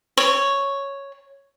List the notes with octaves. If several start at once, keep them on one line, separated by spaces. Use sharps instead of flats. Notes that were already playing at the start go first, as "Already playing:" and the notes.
C#5